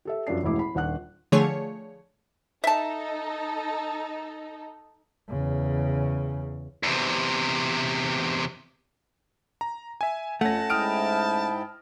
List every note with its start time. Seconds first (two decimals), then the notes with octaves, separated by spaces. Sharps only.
0.05 G4 A4 E5
0.27 F#2 F3 G3 D4 C7
0.43 E1 A1 A2 G#3 E4 D6
0.59 B5
0.75 D#1 D4 F#5 F#6
1.32 D3 F3 A3 G#4 C#5
2.64 D#4 A4 E5 A5
5.29 E2 C#3
6.83 E2 C3
9.61 A#5
10.01 E5 G#5
10.41 F2 A3 C#4 F#5 A5 A#6
10.70 G#2 E4 G5 D#6 F6 D7